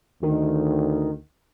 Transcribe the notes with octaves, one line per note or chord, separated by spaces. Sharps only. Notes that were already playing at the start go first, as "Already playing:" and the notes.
D2 D#3